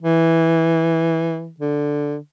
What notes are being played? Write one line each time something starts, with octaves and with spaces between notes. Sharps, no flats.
E3
D3